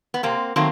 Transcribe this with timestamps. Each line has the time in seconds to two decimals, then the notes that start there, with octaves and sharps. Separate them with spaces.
0.14 B3
0.23 C3 A#3 C4
0.56 D#3 F#3 A3 A#3 C4